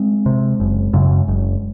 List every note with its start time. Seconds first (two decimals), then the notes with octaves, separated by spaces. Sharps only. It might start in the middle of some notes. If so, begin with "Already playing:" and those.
Already playing: G#3 C4
0.26 C3
0.60 F#1
0.93 F#2 C#3
1.28 F#1